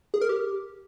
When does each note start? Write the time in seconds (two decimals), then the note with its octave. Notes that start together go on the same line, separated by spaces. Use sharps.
0.14 G#4
0.21 A#4
0.29 G4